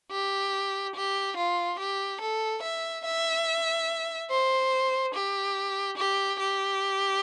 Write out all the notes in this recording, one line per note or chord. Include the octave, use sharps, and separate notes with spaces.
G4
G4
F4
G4
A4
E5
E5
C5
G4
G4
G4